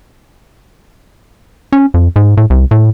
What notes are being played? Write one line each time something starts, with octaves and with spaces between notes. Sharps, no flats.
C#4
F2
G#2
A2
C2
A2